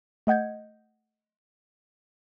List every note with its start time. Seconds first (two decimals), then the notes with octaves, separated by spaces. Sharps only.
0.27 A3 D#5 F#5 G6 G#6